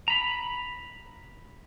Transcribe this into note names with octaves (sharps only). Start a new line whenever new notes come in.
A#5 B5